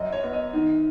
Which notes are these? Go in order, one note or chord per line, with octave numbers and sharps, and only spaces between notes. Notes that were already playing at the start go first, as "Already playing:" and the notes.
Already playing: F#2 D#5
C#5
B3
D#5
D#3